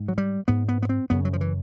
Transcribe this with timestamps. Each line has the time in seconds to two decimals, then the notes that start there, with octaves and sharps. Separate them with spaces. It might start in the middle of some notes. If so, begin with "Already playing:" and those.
Already playing: G#2
0.08 F#3
0.18 G3
0.48 G#2 B3
0.69 B3
0.82 B3
0.89 C4
1.10 F#2 C#3 B3
1.25 F#3
1.33 F3
1.41 E3